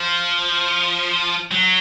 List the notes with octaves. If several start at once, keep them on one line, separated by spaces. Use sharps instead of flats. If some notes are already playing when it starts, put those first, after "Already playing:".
Already playing: F3
F#3